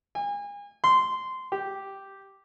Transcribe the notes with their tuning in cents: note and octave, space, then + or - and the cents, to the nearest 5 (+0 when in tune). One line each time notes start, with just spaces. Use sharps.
G#5 -35
C6 -15
G4 -5